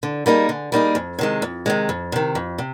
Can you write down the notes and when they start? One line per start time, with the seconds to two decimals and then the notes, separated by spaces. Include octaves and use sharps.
0.03 D3
0.26 G3 A#3 D#4 G#4
0.49 D3
0.72 G3 A#3 D#4 G#4
0.95 F2
1.19 C3 D#3 G#3
1.42 F2
1.66 C3 D#3 G#3
1.89 F2
2.12 C3 D#3
2.35 F2
2.58 C3